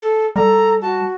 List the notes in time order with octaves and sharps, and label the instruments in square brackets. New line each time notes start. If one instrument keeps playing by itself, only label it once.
[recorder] A4
[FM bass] G3 [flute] A4 [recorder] A#5
[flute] F#4 [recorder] A5